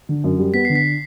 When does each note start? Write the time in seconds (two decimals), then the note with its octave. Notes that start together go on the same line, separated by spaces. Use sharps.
0.09 D3
0.24 F#2
0.39 G3
0.54 B3 B6
0.65 D3 C7
0.75 B6